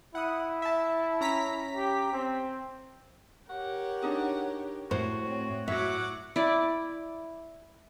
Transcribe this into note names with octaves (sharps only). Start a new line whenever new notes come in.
E4 F#5 D#6
E5 A5
C#4 A#5 B6
G4
C4
G4 A#4 C#5 F#5
D4 D#4 G#4
A2 F#4 C5
C4 C#5
A2 F#3 F#4 E5 F#5 C#6 D6
E4 D5